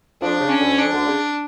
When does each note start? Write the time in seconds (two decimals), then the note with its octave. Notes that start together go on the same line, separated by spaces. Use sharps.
0.21 F2 F3 D4
0.40 C#3
0.49 C#4
0.59 D2 D3
0.78 F2 F3 D4
0.92 D2 D3
1.06 C#3